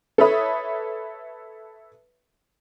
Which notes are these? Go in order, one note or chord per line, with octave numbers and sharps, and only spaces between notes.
A4 B4 C#5 E5 B5 D#6